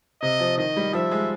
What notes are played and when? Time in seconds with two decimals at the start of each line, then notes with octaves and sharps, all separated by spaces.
0.22 C3 D#5
0.40 F3
0.58 D#3 D#5
0.77 G3
0.93 F3 E5
1.11 G#3